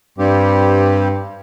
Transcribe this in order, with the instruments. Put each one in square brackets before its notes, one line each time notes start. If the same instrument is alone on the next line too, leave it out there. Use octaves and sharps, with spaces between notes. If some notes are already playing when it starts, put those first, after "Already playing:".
[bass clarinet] G2 [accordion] G3 C4 G4